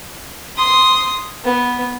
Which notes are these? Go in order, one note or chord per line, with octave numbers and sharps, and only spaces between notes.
C6 D#6
B3